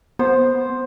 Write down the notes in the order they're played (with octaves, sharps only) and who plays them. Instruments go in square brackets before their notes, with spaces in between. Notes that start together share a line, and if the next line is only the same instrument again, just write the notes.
[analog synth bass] B3 [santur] C5